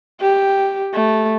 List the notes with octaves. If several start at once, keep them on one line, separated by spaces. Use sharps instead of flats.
G4
A3